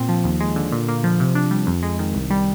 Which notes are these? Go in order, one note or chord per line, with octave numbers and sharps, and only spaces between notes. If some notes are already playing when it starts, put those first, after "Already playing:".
Already playing: A#2 C4
F3
D#2
G#3
D3
A#2
A#3
F3
C3
D4
G3
F2
G#3
D#3
C2
G3